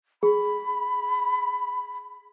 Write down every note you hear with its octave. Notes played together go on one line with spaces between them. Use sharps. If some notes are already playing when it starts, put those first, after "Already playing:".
G#4 B5